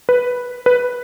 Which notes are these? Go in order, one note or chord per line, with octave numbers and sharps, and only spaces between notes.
B4
B4